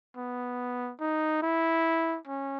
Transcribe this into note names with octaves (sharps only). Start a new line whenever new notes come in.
B3
D#4
E4
C#4